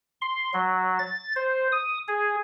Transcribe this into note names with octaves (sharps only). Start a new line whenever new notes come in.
C6
F#3
A6
C5
D#6
G#4